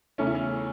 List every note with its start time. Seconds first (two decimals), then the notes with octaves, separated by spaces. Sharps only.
0.18 E2 C#3 E3 A3 C#4
0.27 E4
0.35 C#4